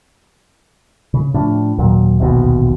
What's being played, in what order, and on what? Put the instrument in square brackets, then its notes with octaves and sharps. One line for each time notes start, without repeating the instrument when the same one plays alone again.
[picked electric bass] C#3
A2 F3 D4
D#2 A#2 F#3
D1 A#1 D#2 B2